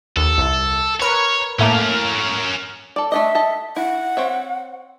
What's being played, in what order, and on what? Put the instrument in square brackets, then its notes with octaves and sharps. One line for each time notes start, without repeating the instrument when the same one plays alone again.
[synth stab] D#2 [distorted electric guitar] A4
[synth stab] C2
[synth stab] A#4 B4 C#7 [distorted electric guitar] C#5
[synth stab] A2 A3 A#3 [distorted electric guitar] C#4 A#4
[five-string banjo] A4 D5
[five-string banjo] A3 D4 D#5 [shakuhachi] E5
[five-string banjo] A4 D#5 A5
[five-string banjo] E4 [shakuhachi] F#5
[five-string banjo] C4 C#5 E5